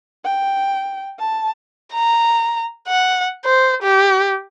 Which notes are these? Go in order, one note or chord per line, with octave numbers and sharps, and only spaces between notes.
G5
A5
A#5
F#5
C5
G4